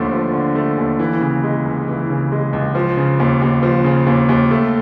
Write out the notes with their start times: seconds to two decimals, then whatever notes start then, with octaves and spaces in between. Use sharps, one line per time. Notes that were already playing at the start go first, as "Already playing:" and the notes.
Already playing: D#2 D3 F3 A3
0.12 F3
0.33 D3
0.55 A3
0.78 D#2
0.99 E3
1.21 C#3
1.43 G#3
1.65 C#2
1.88 E3
2.10 C#3
2.32 G#3
2.53 C#2
2.75 F3
2.97 C#3
3.20 D#2
3.42 D#2
3.63 F3
3.84 C#3
4.07 D#2
4.29 D#2
4.51 A3